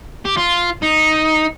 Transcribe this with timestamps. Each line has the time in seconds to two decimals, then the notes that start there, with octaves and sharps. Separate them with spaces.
0.25 G4
0.37 F4
0.82 D#4